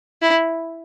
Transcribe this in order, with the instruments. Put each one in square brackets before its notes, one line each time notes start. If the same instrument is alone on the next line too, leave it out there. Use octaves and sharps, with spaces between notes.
[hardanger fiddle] E4